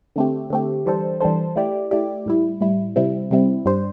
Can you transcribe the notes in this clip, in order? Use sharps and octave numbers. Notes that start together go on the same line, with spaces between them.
D3 A3 C4 G4
D3 A3 C4 G4
E3 G3 D4 A4 C5
E3 G3 D4 A4 C5
A3 E4 G4 D5
A3 E4 G4 D5
A2 G3 E4
A2 G3 E4
C3 G3 C4 E4
C3 G3 C4 E4
G2 G3 D4 C5